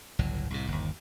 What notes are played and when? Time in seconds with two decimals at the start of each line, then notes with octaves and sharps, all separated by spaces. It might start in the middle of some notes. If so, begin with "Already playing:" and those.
0.19 G1 C#2 A2 F#3
0.50 C2 A2 C3
0.68 G1 D#2